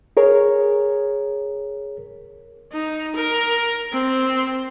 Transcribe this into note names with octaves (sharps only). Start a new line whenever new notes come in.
G#4 A#4 C#5
D#4
A#4
C4